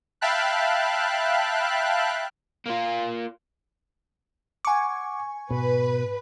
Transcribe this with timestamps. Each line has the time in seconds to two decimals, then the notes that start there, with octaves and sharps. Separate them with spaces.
0.21 E5 F5 G5 A5 B5 F#6
2.66 A#3 F4
4.65 F#5 G#5 C#6 D6
5.50 G#2 B2 B4